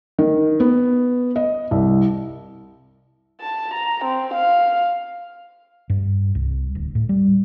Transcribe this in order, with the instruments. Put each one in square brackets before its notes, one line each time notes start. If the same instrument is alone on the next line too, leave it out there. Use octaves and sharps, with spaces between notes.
[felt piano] D#3
B3
D#5
C2
[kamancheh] A5
A#5
C4
F5
[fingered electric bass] G2
C2
D1
A2
G3